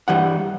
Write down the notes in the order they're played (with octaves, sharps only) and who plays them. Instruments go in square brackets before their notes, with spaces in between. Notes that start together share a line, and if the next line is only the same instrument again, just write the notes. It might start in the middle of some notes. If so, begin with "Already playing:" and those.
[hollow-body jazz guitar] G2 E3 G3 F#5